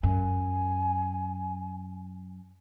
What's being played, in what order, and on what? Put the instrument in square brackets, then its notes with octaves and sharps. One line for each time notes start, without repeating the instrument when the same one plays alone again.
[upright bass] F#2 [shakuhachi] G#5